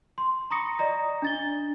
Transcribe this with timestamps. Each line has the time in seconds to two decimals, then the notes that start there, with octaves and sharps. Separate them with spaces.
0.18 C6
0.50 A#5 B5 C#6 D#6 A#6 C#7
0.79 D5 D#5 A#5 A#6
1.22 D4 A6 G7